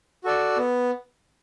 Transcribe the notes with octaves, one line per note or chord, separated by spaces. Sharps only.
F#4 A4 D5
B3